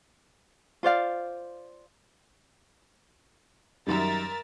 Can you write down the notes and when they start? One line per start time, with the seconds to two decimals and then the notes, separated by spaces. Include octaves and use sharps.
0.83 F4 C5 D5 F5
3.87 F#2 D#3 G3 A#4 E5 A6